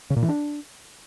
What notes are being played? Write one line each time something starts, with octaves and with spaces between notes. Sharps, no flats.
C#3
A#2
E3
D4